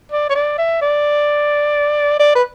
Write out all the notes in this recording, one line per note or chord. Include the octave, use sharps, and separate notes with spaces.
D5
C#5
D5
E5
D5
D5
B4